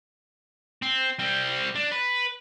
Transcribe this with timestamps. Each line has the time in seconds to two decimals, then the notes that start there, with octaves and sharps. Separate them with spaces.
0.82 C4
1.19 G3 C4
1.75 D4
1.92 B4